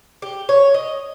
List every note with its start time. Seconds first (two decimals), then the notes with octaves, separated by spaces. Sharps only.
0.22 G4
0.49 C#5
0.74 D#5